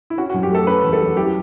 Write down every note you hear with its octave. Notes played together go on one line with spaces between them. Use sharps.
E4
C#4 F#4
F#4
F#2
G4
A3 A4
C#4 B4
E2
A4
F#3
E4 G4